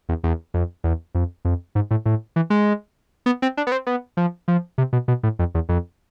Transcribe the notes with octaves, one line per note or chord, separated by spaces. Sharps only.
E2
E2
F2
E2
F2
F2
G#2
A2
A2
E3
G#3
B3
C4
D4
B3
C4
B3
F3
F3
C3
B2
B2
A2
F2
E2
F2